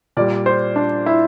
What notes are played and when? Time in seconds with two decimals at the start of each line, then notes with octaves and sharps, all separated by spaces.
0.17 A#2 G3 D5
0.46 C5
0.76 D4
1.06 E4